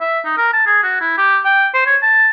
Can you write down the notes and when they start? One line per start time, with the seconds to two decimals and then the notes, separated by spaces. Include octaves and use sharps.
0.01 E5
0.25 D#4
0.37 A#4
0.53 A5
0.66 G#4
0.83 F#4
1.01 E4
1.17 G4
1.45 G5
1.74 C5
1.87 C#5
2.02 A5